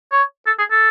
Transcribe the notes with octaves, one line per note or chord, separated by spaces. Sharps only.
C#5
A4
G#4
A4